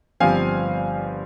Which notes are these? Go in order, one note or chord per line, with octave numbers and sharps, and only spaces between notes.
G1 G2 F3 C4 F5 G#5